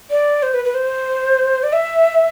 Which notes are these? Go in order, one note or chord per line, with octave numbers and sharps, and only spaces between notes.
D5
C5
B4
B4
C5
D5
E5